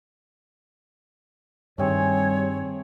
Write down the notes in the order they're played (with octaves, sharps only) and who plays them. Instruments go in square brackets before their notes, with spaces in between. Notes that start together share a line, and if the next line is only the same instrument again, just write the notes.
[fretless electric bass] G2 D#3 [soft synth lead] G3 [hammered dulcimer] A3 C4 G#4 [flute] C#5